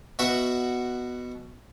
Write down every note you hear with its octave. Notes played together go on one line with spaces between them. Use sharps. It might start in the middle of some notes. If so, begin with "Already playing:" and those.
B2 F#4 E5 F#5